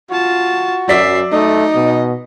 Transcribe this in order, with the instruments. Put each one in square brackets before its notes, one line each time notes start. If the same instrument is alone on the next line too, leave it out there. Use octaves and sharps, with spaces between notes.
[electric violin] F4 A5 [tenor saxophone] F#4
[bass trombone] F#2 [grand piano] F#3 D5 B6 [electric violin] E5 C7
[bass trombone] A3 [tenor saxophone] D#4 [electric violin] D#5
[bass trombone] B2